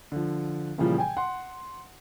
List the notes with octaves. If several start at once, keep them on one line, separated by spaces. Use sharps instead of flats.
D3 F3
A#2 C#3 E3 F3 G3 G#4
G5 G#5
F#5 C6